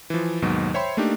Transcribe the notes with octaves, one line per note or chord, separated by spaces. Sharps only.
E3 F3
D#2 G#2 B2 F#3
C5 C#5 E5 G5 B5 C6
A3 A#3 D4 D#4 G4